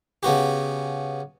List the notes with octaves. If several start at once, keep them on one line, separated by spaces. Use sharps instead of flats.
C#3 B3 F#4 G4